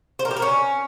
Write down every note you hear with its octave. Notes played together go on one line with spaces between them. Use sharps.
C5
A#4
G4
A#4
C#4